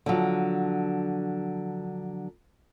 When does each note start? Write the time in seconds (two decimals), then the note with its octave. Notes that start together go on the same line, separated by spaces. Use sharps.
0.06 D3 F3 F#3